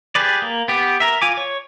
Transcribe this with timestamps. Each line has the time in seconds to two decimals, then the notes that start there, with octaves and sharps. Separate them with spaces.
0.15 G4 G#4 B4 D5
0.42 A#3
0.68 B3 G4
1.00 A#4 E5
1.22 F4 G#5 D6
1.37 C#5